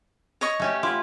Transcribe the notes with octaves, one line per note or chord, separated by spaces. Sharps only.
C#5 D#5 C#6
A3 C#4 G4
E4 F4 F#5 D6